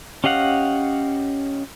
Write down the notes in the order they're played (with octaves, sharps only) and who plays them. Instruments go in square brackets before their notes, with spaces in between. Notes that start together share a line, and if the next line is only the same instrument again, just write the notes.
[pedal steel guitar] C#4 G4 D#5 F5 F#5